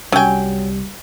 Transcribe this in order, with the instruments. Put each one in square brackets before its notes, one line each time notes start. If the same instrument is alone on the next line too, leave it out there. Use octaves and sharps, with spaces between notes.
[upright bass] C2 [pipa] F#3 G5 [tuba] G3 [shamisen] C#4 G#5